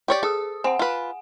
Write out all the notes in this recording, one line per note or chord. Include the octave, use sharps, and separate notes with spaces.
G4 C#5 D5
G#4 A4 D#6
C4 F#5 G#5
F4 B4